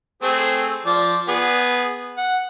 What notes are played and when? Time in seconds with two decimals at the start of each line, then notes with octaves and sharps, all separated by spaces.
0.23 A3 C4 G#4
0.86 F3 D5
1.28 B3 G#4
2.18 F#5